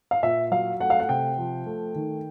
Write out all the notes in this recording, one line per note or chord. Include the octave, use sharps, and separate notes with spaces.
F5
A#2 E5
F#3 F5
A3 F#5
F5
F#5
C3 G5
F3
A3
D#3